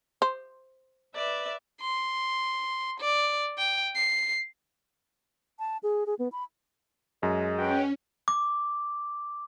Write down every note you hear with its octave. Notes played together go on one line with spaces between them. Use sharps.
C5
B4 D5 E5
C6
D5
G5
C7
A5
G#4
G#4
B3
B5
F#2 G#3
C#4 F#4 B4 G5
D6